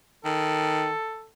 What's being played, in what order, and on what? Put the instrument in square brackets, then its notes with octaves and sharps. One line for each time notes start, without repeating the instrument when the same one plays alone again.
[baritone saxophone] D#3 [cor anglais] A4